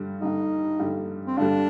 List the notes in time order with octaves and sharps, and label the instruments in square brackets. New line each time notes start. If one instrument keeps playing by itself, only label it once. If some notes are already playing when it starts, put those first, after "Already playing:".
Already playing: [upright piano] G2 D3 G3
[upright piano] G2 D3 G3 [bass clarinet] D#4
[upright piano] G2 D3 G3
[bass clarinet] C4
[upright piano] G2 D3 G3 [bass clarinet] D4